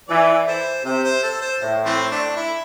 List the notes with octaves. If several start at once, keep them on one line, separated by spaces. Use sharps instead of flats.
E3 D5
E4 A4 C5
C3 C5
C5
A4
C5
A2
E3 A3 C4
A3 D4
E4